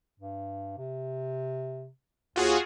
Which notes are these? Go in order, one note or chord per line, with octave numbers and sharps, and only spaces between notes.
G2
C3
D#2 F4 F#4 G#4